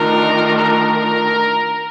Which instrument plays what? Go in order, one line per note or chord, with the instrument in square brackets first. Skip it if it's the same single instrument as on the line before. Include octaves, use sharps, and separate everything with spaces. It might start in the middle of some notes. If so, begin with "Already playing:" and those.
Already playing: [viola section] D#3 A3 D4 F4 [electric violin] A#4
[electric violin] A#4